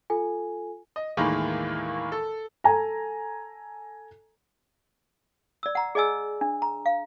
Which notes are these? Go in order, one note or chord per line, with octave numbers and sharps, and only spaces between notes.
F4 A4 G#5
D#5
D#2 A2 D#3 E3 G#3 A#3
A4
A4 G#5 A#5
D5 E6
F#5 A#5
G#4 D5 D#5 G#5 E6
D4
A#5
F5